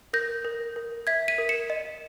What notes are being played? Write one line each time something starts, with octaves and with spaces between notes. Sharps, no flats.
A#4 G6 A#6
A#4
A#4
E5 G#6 B6
B6 D#7
A#4
C#7 E7
D#5